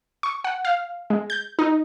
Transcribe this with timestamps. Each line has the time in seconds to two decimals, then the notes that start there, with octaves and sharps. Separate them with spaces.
0.23 C#6
0.44 F#5
0.65 F5
1.10 G#3
1.30 G6
1.59 D#4